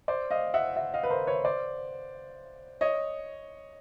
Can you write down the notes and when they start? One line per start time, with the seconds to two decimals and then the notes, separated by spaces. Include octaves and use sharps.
0.08 C5 D5
0.31 D#5 F5
0.54 E5 F#5
0.76 E5 F#5
0.94 D#5 F5
1.03 B4
1.10 A#4 C5
1.27 B4 C#5
1.45 C5 D5
2.81 C#5 D#5